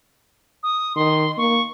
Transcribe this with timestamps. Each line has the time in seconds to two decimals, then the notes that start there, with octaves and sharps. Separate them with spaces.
0.63 D#6
0.96 D#3 C6
1.38 A#3 C#6